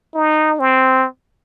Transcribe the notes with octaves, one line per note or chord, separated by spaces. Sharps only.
D#4
C4